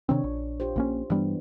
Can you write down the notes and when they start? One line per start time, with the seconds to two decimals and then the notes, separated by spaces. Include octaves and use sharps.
0.09 C3 D#3 C4 D4 C#5
0.24 A#1
0.60 F4 G4 C5
0.76 A#1 A#3 C#4
1.10 G2 E3 G3 B3 D4